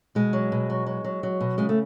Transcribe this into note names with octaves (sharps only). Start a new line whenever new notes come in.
B2 G#3
F#3
B2
F#3
F#3
F#3
F#3
B2
C#3 G#3
A3